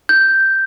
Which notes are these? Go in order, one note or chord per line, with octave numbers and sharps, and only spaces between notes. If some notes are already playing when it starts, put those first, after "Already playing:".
G6